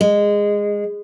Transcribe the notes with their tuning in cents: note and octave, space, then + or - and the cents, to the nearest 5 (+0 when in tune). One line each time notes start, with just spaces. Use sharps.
G#3 -15